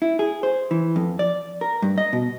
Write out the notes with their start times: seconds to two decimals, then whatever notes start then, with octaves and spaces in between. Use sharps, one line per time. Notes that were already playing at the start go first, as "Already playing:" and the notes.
0.02 E4
0.19 G#4
0.43 C5
0.71 E3
0.96 F2
1.19 D5
1.61 A#4
1.82 G2
1.98 D#5
2.13 B2